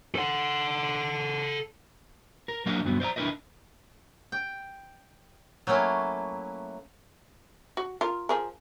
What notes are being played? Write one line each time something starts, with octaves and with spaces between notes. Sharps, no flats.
A4 F#5
A#4
F#3 A#3 D4 A#4 D#5 F5
D2 G2 F#3 B3
C5 D5 E5 A#5
D4 E4 A#4 B4 D#5
G5
F#3 A3 A#3 C#4 E4
F#4
F4 A#4
F3 G#4 A#4